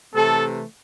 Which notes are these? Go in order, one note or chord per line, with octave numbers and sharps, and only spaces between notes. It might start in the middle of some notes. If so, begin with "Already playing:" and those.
C3 E3 A3 C4 A4